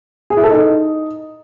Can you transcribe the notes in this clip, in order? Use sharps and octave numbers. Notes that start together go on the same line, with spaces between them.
G#4
E4
A4
D#4